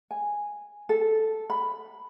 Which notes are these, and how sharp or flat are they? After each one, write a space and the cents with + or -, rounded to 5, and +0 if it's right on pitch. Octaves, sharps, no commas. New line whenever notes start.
G#5 -5
A4 -5
B5 +5